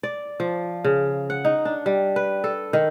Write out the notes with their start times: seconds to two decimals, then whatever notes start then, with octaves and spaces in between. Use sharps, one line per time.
0.03 D5
0.40 F3
0.84 C#3
1.30 F#5
1.45 D#4
1.65 D4
1.86 G3
2.16 B4
2.44 A4
2.73 D#3